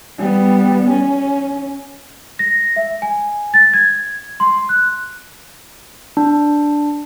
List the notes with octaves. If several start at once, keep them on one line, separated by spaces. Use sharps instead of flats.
G3 B3
C#4
A#6
E5
G#5
A6
G#6
C6
F#6
D4